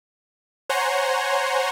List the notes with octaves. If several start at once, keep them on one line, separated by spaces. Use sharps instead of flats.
C5 C#5 F#5 G#5 A#5 C6